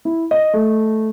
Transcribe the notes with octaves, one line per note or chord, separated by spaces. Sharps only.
E4
D#5
A3